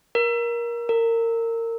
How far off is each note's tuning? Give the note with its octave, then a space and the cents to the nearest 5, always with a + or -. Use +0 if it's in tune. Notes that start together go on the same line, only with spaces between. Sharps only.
A#4 +20
A#4 -25